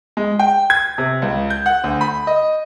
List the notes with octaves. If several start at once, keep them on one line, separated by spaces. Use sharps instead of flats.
G#3
G5
G#6
C3
C#2
G6
F#5
D2
B5
D#5